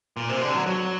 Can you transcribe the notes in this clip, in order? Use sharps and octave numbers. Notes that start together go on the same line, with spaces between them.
A#2
C3
D3
F#3
F#3